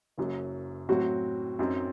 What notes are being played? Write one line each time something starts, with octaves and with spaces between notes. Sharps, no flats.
F#1 F#2 F#3
A2 F#3 C4 F#4
F#2 F#3 C4 D#4